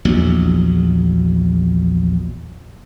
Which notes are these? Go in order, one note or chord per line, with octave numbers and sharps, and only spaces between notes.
A#1 E2 F#3